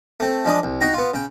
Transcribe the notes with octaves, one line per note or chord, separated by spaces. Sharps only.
A3 C4
F3 G#3 D4 D#6
C2
D#4 F#4 G5 A#5
B3 F4
C#3 G5